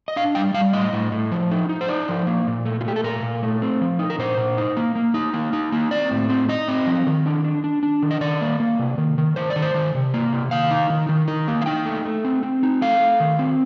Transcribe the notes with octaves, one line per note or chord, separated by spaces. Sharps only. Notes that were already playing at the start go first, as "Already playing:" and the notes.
D#5
D4 F5
G3 G5
G3 F5
A2 D#5
A2
A2
F3
D#4
D#4
C5
D#4 D5
F3
A#3
A#2
A3
F4
A3 G4
A4
A#2 A#4
A#2
A3
C4
F3
D#4
A#4
A#2 C5
A#2
D#4
A#3
A#3
D#4
A#3
D#4
A#3
C4 D5
A2
C4
D#4 D#5
C4
F3
D#3
D4
D4
D4
D4
D#3
D#5
D#3 D5
A#3
A#3
C3
D#3
D#3
D#3 C5
D5
D#3
C5
D#3
C3
A#3
C3
D#3 F5
D#4
D#3
D#3
D#4
A#3
F5
D#4 G5
A3
A3
C4
C4
D#4
A3 F5
A3
D#3
C4